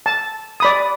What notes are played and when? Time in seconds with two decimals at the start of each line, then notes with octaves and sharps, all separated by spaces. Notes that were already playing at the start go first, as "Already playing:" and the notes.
0.06 A5
0.60 D5 B5 D#6